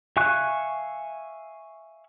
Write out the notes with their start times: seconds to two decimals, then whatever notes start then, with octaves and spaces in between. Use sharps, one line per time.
0.17 E5 F5 G#5 C#6 F#6